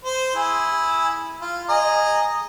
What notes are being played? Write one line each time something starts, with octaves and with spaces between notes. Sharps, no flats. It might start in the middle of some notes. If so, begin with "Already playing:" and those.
C5
E4 G#4
F4
G#4 D#5 A#5